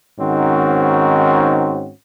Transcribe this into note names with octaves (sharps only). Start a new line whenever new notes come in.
G#2 D#3 C4 C#4 F#4